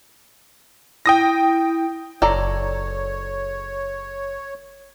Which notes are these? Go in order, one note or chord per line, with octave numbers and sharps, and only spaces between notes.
E4 G5 D#6 A#6
F#1 A4 C#5 D5 A#5